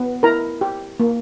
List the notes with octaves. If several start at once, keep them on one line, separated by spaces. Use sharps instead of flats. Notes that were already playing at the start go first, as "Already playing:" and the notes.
Already playing: B3
E4 A#4 A#5
G4
A#3